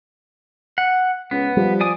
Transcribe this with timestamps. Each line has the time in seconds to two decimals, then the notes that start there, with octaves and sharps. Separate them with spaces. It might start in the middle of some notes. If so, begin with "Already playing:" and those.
0.78 F#5
1.31 C#2 B3
1.57 F3 G3
1.81 D5 G#5 D#6